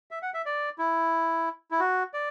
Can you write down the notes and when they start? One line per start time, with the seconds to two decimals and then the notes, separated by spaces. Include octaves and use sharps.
0.11 E5
0.22 F#5
0.34 E5
0.46 D5
0.78 E4
1.71 E4
1.80 F#4
2.14 D5